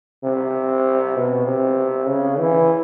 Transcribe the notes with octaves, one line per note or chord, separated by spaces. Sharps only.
C3
B2
C3
C#3
E3